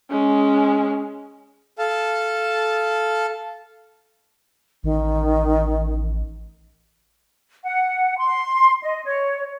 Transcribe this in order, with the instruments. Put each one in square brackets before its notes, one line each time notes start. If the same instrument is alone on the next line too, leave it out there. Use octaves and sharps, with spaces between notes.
[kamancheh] G#3 C#4
[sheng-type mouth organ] A4 F5 A5
[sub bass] A1 [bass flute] D#3
[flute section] F#5
C6
D#5
C#5